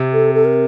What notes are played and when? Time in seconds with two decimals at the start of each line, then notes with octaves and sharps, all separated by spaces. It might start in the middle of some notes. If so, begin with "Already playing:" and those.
Already playing: C3
0.13 A4
0.35 A4
0.45 A#4